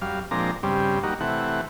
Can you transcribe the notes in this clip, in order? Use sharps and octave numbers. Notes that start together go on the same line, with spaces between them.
F#2 G3 F5
A#2 F3 G#3 C4 D4 A#5
G2 C#3 G3 C4
G3 A#3 D#4 F#4
C3 E3 A3 F#5